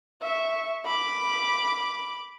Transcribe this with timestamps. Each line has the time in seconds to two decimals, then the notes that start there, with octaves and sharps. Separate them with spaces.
0.22 E5 C#6
0.86 B5 D6